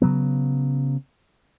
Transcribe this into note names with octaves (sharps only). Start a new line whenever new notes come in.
C#3 F#3 B3